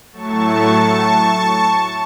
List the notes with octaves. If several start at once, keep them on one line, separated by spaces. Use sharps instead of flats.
A2 F#3 A3 A5 C#6